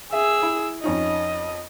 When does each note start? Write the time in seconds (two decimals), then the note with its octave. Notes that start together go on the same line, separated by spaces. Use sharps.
0.13 G#4 E5 E6
0.42 E4
0.84 F2 C#4 D#4 D#5